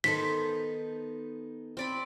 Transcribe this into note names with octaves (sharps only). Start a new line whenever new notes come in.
D#3 B3 D#4 A4 C5 C6 B6
C4 D5 B5